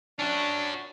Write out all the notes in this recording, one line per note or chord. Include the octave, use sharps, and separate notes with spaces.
C#4 D4 F#4